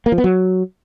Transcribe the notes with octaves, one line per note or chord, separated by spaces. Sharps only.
A#3
F3
B3
F#3